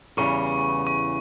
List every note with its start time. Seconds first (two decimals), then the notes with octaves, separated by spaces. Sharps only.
0.17 E2 C#3 E3 G3 C#6
0.87 C#6